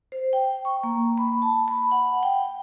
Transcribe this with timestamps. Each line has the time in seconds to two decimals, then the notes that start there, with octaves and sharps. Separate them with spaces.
0.12 C5
0.33 G5
0.65 C#6
0.83 A#3
1.18 B5
1.42 A5
1.68 B5
1.91 F#5
2.23 G5